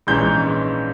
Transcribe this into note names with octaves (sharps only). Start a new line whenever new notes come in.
A#1 G#2 E3 G#3 C#4 G6